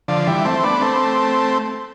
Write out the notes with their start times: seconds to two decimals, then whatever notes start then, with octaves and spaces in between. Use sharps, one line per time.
0.08 D3 F3
0.27 E3 G3
0.45 A3 C4
0.63 B3 D4
0.82 A3 C4